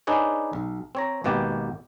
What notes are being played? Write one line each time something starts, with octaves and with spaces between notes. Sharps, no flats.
D4 D#4 G#4 B4 C#5
B1
C4 C#5 A#5
G#1 B2 A#3 B3 G4 G5